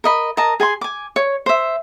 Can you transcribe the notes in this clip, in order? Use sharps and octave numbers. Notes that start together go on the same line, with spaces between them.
A#4 D#5 B5
A#4 D#5 A5 A#5
G#4 G#5 A#5 C6
G#5 D6
C#5
C5 E5